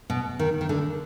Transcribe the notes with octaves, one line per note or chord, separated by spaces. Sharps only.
B2
D#3
D#3
D3